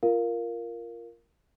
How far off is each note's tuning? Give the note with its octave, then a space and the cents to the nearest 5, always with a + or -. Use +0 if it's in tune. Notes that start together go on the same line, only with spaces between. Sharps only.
F4 -15 A#4 +0 F5 +0